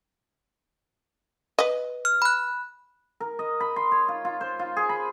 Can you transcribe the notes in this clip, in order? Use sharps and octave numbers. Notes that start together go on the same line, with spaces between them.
B4 D#5
F6
B5 F#6
A#4
D#5
B5
C6
C#5
F4
F4
C5
F4
G#4
B5